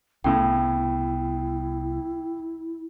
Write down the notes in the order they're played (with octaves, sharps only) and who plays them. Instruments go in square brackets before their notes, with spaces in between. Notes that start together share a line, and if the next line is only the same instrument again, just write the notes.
[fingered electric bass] C2 B3 [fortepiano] A2 C#3 [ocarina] E4 [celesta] G5